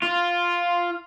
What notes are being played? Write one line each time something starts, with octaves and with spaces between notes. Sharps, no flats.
F4